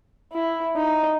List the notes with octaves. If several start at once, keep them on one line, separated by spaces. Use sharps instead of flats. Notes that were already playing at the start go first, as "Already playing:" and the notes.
E4
D#4